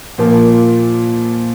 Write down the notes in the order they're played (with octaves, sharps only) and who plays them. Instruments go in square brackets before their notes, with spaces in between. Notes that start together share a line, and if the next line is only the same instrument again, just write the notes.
[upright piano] A#2 F3 A#3